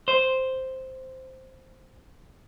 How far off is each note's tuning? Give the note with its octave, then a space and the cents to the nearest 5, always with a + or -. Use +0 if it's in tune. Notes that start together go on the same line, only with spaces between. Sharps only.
C5 +0